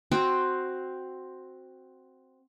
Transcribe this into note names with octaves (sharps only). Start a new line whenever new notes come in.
C4 F#4 C5 G5